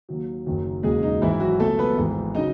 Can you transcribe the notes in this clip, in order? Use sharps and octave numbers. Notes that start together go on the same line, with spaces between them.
D#2 D#3 F#3
F#1 F#2 D#3 F#3
E1 D#2 C#3 F#3 G#3 G#4
D#4
G#1 G#2 E3 E4
F#3 F#4
C#2 B2 F#3 A3 A4
B3 B4
G#1 G#2 E3
C#3 F#3 D#4 D#5